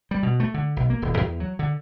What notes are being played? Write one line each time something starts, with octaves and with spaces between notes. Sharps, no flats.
G3
B2
A3
D3
B1
A#3
D#1
E2
F#3
D3